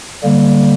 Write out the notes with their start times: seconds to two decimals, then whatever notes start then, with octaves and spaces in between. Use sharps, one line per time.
0.24 D3 G3 A#3